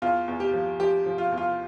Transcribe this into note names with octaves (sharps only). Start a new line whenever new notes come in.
E2 F4
E2
G4
F3
F3 G4
F3
F4
E2
F4